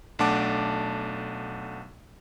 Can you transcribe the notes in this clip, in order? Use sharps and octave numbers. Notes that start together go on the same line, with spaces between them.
B1 A3 D4 F#5 A5 D6